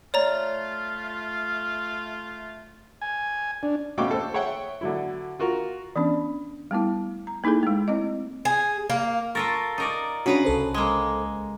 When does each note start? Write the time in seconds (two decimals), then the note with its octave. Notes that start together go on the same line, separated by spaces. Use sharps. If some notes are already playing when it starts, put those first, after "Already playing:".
0.14 A3 F4 C#5 D5 A#5
3.02 G#5
3.63 D4
3.98 B2 A3 C#4 F5 G5 D6
4.11 A4 C5
4.34 G#4 C#5 E5 F#5 G5
4.81 D3 F#3 E4
5.39 F4 F#4 A#4
5.96 E3 B3 C#4 D4
6.71 G3 A3 B3 E4
7.27 A#5
7.44 A#3 D#4 E4 G#4 A4
7.63 G#3 A3
7.88 C4 E4 D#5
8.45 G#4
8.90 A#3
9.35 F4 A4 A#4 C#6 A6 A#6
9.78 D#4 A#4 D5
10.26 C#3 D4 F#4 B4 A#5
10.44 C2 A4 C5
10.74 G#3 A#3